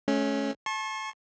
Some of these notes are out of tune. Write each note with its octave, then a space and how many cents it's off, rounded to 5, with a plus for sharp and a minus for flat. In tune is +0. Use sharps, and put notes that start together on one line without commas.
A3 -35 C#4 +0
A5 -15 C#6 -45